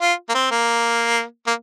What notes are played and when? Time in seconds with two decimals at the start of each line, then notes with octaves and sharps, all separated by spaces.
0.01 F4
0.29 A#3
0.34 C4
0.51 A#3
1.47 A#3